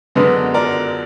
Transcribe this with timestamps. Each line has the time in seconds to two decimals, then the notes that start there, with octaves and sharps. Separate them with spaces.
0.15 F#2 D3 G#3 B3 D4 B4 D#5
0.54 A#4 D5